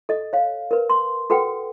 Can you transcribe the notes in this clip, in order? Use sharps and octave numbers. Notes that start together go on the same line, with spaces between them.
A4 D#5
C#5 F5
A#4 B4
C6
F#4 A4 B4 F#5 G5